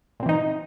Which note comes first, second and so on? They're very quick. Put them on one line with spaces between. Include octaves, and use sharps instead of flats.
A#2 C4 E3 D#4